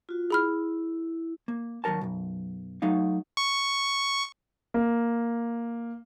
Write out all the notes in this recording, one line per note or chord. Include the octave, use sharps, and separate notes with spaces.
F4 F#4
E4 G#4 B5 F6
A#3
D#2 F#3 G4 A#4 A5
B1 F#2
F#3 A3 D#4 F5
C#6
A#3